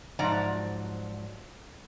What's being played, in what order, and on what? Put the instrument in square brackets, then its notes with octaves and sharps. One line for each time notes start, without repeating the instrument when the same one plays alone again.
[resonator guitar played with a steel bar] G#2 F3 F#3 D5 A#5